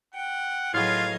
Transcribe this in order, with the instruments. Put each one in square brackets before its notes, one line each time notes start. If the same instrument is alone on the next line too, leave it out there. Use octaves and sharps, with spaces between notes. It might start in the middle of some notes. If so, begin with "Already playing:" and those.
[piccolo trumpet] F#5 [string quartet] G5
[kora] A2 B3 G#4 [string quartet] F#3 D#5 G#6 [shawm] F4 [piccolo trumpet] F5